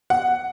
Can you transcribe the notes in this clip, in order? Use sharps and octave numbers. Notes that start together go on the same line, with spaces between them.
F#5